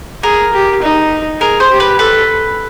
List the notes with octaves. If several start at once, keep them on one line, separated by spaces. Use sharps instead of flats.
G#4 A#4
G4
D#4
G#4 A#4
C5
G4
B4
A4 B4